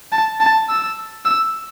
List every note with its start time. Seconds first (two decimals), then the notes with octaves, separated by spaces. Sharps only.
0.12 A5
0.41 A5
0.69 E6
1.25 E6